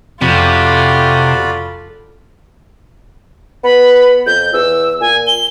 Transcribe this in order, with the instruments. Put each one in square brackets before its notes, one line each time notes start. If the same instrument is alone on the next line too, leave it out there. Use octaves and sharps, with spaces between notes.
[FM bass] F2 [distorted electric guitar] C3 [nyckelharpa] F4 A4 [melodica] F#4 D5 B5
[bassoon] B3 [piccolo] B5
[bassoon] F2 [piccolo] G6
[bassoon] E2 [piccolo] E6
[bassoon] A#2 [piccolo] G#5
[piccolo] G7